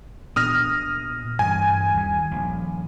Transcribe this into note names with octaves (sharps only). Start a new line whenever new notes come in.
A#2 B3 D4 D#6 F6 A#6
G2 E3 G#5
D#2 G3
D#1 A#1